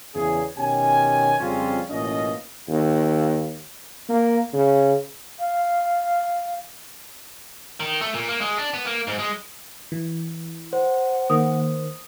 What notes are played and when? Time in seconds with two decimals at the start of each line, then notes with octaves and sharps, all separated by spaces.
0.15 E2 C#3 G#4
0.57 B2 D#3 C#4 G4 G#5
1.40 F2 C#3 G3 C4 C#4 F4
1.90 A1 B2 A#3 C#4 F4 D#5
2.68 D#2
4.09 A#3
4.53 C#3
5.39 F5
7.80 D#3
8.01 A3
8.14 A#2
8.28 A#3
8.41 G#3
8.58 D4
8.74 B3
8.86 A#3
9.07 G#2
9.19 G#3
9.92 E3
10.73 C5 F#5
11.30 D#3 A#3 D#6